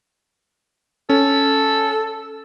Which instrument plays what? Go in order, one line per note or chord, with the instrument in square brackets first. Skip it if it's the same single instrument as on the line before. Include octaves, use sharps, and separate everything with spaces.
[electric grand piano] C#4 [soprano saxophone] A4